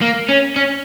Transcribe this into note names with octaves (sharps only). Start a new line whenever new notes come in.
A#3
C#4
C#4